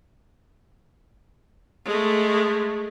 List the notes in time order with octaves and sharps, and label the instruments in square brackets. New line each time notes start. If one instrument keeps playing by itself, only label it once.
[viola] G#3 A3